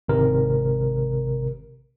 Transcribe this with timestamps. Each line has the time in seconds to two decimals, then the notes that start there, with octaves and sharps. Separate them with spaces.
0.08 G#1 C3 A#4